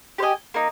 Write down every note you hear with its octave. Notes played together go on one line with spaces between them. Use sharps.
G4 C5 D#5 G#5
A#3 D#4